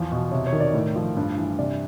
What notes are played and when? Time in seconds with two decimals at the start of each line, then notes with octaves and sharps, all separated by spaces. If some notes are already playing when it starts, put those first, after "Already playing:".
Already playing: E2 F3
0.12 B2
0.32 C3 C#5
0.47 C#5
0.53 D#3
0.60 D5
0.74 A2
0.96 F3
1.17 G2
1.37 E3
1.59 C3 D5